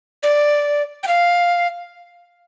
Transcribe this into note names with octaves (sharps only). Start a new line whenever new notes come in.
D5
G5
F5